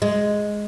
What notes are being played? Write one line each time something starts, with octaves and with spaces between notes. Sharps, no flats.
G#3